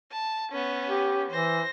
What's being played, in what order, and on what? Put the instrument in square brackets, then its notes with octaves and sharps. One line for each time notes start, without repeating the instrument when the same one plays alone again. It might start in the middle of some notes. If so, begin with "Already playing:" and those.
[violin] A5
B3 C#4
[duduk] G4
[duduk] E3 [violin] C5 A#6